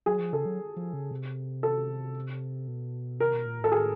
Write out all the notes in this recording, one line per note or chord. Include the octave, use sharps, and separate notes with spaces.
F#3 G#4
F3
C#3 A4
F#3
F3
C#3
C3
A4
B2
C3 A#4
B2
A#2
A2 A4
G#4